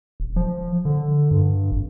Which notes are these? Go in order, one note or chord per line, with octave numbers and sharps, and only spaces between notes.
D#1
F3
D3
G2
G#1